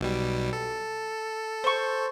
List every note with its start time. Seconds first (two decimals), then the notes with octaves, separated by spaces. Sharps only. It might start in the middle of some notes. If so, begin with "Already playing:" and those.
0.01 B1 B2 G3
0.53 A4
1.64 C5 C#6